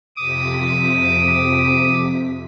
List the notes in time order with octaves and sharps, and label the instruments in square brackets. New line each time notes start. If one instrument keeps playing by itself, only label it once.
[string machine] F2 C3 B6 [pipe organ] D6 D#6